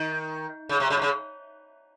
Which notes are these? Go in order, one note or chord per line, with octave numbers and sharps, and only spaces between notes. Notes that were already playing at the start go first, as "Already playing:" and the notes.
Already playing: D#3
C#3
C3
C#3
C3
C#3